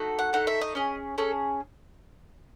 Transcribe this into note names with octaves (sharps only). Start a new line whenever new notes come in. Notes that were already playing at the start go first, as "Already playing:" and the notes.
Already playing: A3 D#4 F#4 A4
F#5
A3 D#4 A4 F#5
E5
D#5
C#4 G#4 D#5
C#4 G#4 A4